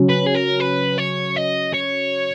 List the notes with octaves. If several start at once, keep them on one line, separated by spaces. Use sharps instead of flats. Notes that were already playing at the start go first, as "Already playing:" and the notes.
Already playing: C#3 F#3 C#4
B4
G#4
A#4
B4
C#5
D#5
C#5